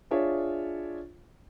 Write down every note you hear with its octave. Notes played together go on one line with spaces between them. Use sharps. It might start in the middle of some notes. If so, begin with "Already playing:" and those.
D4 F4 G#4 C#5 E5